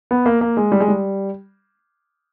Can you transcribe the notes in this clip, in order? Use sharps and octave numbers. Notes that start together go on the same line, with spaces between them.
B3
A#3
A#3
G#3
G3
G#3
G3